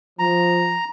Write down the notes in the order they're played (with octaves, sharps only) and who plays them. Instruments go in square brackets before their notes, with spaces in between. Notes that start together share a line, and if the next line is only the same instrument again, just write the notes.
[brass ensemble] F3 [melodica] A#5